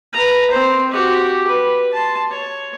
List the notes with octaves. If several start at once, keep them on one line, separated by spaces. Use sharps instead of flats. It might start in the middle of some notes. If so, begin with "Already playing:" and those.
B4 A#5
C4 C5
F#4 G4
B4
A5 C6
C#5